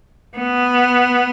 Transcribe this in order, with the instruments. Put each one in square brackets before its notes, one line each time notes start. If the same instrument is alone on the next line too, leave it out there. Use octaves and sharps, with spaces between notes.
[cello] B3